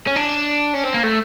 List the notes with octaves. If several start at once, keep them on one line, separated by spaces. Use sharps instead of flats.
C#4
D4
C#4
C4
A#3
A3